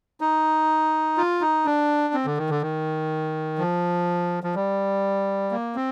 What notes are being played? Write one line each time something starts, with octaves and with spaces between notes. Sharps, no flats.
D#4
F4
D#4
D4
C4
D3
D#3
D3
D#3
F3
F3
G3
A#3
C4